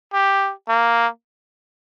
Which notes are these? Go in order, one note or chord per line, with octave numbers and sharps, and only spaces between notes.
G4
A#3